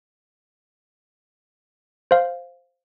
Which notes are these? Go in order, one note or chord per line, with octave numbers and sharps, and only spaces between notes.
C5 F5